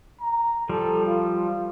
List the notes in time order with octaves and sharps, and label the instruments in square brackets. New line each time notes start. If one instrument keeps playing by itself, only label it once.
[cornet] A#5
[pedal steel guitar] F3 G3 [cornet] A4
[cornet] F4